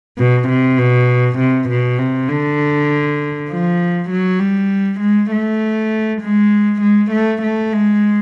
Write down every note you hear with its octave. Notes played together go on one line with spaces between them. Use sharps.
B2
C3
B2
C3
B2
C3
D3
F3
F#3
G3
G#3
A3
G#3
G#3
A3
A3
G#3